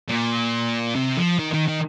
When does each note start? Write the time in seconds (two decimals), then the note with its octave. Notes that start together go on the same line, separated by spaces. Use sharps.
0.09 A#2
0.96 C3
1.18 F3
1.39 D#3
1.53 D#3
1.68 D#3